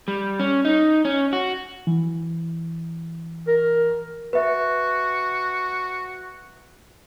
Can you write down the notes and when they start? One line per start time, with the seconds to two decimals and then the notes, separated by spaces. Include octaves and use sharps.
0.08 G3
0.40 C#4
0.65 D#4
1.05 C#4
1.33 F#4
1.87 E3
3.48 A#4
4.33 F#4 B4 E5